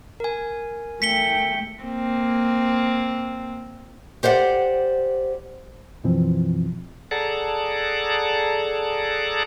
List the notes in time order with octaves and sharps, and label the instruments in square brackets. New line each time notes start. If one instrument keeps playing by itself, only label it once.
[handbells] A#4 G#5
[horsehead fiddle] A3 G5 [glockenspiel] B6 C#7 G7
[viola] A#3 C4
[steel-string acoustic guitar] G4 C5 D5 F5 F#5
[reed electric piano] F#2 B2 E3 F3 C4
[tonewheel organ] G#4 A4 D5 F#5 A5 A#5